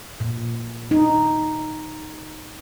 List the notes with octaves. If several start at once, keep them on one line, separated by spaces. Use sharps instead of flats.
A#2
D#4